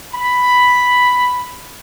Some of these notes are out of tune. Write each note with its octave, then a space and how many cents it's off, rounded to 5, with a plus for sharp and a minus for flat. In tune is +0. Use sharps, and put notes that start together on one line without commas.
B5 +5